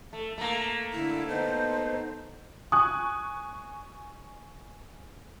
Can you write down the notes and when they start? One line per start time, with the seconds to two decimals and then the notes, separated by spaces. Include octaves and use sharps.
0.13 A3 A4
0.38 A3 A#3 A#5
0.94 D3 E4
1.28 B3 D#4 A4 C5
2.72 G#5 C#6 D#6 F#6